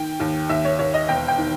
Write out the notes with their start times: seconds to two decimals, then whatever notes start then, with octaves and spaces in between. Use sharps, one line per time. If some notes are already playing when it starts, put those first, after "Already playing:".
Already playing: D#3 G5
0.20 D#2
0.49 D#2 E5
0.65 C#5
0.79 D#2 C#5
0.94 D#5
1.09 E1 G5
1.28 G5
1.38 D#3